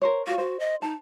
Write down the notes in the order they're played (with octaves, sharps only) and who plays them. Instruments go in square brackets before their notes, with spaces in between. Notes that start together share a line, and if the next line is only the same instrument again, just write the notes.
[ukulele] A#4 C5 C#5
[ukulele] F4 C#5 [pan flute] F#4
[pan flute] F#4 [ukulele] C5
[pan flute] D#5
[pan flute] D#4 [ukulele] A5